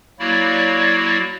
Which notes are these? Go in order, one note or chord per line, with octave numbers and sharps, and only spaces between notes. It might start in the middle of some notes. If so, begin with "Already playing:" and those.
F#3 A#3 E4 F#4 C#5 D5